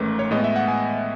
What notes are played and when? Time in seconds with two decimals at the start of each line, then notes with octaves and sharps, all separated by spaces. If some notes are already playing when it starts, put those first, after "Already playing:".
Already playing: A1 G#2 D#3 A3 C#4 B4
0.19 C#5
0.31 A2 G#3 B3 D#5
0.44 E5
0.56 F#5
0.68 G#5